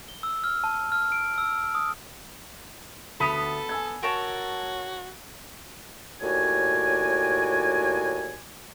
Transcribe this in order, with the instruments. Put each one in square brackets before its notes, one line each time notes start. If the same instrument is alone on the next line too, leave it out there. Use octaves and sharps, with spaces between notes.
[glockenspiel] G7
E6
F6
A5
F6
D7
E6
D#6
[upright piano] D2 D#6 D#7 [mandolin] B3 B5 [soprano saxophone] A4
[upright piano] G#5 E6 G#6
[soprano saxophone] F#4 [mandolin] A#4 C#5 A5
[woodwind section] D#2 A2 F#4 D5 G#5